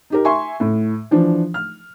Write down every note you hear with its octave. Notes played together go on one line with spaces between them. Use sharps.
D#4 G4 A#4
E5 G#5 C6 C#6
A2
E3 F3 D4
F6